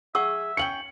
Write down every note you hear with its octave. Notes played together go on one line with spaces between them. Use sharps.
G#4 E5 F#5 C#6 E6
C#4 F5 G5 C#7 F#7